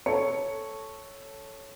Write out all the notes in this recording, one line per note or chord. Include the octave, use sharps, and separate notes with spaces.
A4 C#5 C#7